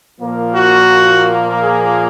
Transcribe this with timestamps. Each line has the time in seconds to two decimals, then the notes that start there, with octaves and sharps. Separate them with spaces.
0.20 A#2 F3 A#3
0.54 F#4
1.61 G#4